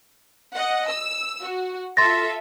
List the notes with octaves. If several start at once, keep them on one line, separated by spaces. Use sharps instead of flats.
D#5 F#5
E6
F#4
F4 A4 E5 C6 A6 A#6